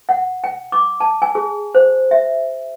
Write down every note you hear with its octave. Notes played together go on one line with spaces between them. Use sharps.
F#5
G5
D6
A5
G#5
G#4
C5
E5